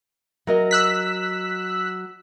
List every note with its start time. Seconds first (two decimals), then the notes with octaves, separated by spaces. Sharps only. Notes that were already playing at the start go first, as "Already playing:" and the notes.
0.47 F#3 A#4 D#5
0.71 E6 F#6 B6